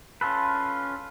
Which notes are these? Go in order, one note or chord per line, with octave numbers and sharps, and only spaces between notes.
C#4 F4 A4 B4